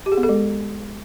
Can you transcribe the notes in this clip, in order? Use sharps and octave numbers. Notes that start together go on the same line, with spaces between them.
G4
G#4
B3
A4
G#3